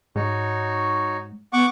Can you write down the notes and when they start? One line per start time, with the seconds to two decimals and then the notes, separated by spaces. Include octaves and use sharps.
0.16 G#2 D#4 F#4 C#5
1.53 B3 F#5 C#6 D6